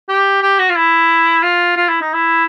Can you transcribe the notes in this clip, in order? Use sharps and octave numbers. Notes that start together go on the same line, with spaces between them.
G4
G4
F#4
F4
E4
F4
F4
E4
D#4
E4